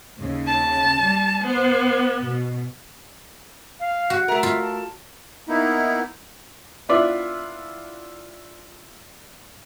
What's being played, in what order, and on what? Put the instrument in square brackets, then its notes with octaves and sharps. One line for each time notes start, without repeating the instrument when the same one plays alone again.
[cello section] D#2 C#3
[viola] A5
[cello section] G3
[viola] B3 [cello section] C5
[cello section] B2
[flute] F5
[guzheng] F#4
[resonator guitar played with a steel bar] A3 A#4 [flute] E5
[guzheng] F4
[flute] A5
[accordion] A#3 B3 D#4 E4
[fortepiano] B3 D4 E4 F4 D5 E5